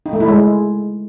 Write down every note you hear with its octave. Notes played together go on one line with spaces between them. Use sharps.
D#4
A3
E4
G#3